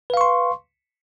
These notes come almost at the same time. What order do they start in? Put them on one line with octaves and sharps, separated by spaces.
B4 F5 C#6 C6